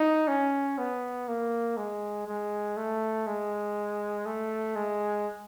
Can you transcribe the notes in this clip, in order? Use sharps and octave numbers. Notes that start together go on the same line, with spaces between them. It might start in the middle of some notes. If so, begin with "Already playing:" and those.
Already playing: D#4
C#4
B3
A#3
G#3
G#3
A3
G#3
A3
G#3